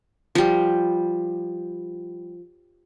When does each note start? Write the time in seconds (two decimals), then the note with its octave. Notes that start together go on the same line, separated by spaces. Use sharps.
0.35 F3 G3